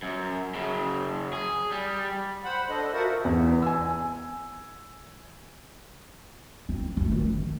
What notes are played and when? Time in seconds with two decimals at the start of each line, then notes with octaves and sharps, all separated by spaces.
0.03 F#2
0.55 F#2 C#3
1.33 G#4
1.72 G3
2.44 C5 F#5 B5
2.69 D4 A4 D#5
2.93 F4 F#4 A#4 C5 E5 F#5
3.25 E2
3.62 G#5 E6
6.69 C4
6.97 F3 A3
7.12 D#3